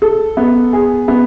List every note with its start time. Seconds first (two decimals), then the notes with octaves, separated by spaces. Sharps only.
0.02 A4
0.37 B3
0.73 G#4
1.08 B3